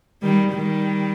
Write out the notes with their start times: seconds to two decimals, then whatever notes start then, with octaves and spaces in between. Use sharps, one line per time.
0.22 D#3 G3
0.53 D#3 G3